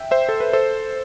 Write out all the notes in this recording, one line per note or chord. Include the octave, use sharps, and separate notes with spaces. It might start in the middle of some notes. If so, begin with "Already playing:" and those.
Already playing: E5 G5
C5 E5
A4
B4
A4 C5